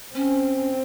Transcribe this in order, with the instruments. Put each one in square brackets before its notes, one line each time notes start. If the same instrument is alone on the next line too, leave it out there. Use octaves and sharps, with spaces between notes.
[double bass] C4 [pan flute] C#4